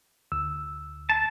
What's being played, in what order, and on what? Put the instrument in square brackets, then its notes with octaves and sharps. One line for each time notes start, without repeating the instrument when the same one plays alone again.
[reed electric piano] D2 E6
[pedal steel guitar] A5